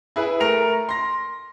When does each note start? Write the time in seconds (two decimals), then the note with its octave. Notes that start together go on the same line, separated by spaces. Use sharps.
0.16 E4 G#4 B4
0.40 A3 A#4 F7
0.89 C6 A#6